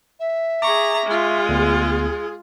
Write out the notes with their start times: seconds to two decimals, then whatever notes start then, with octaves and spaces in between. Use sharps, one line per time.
0.19 E5
0.62 G#4 A#5 C#6 D6
1.06 G#3 F4
1.49 D2 B3 G#4